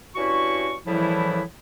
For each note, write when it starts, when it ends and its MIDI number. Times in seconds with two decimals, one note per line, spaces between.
0.15 0.74 43
0.15 0.74 61
0.15 0.74 64
0.15 0.74 66
0.15 0.74 85
0.86 1.42 45
0.86 1.42 49
0.86 1.42 52
0.86 1.42 53
0.86 1.42 55
0.86 1.42 64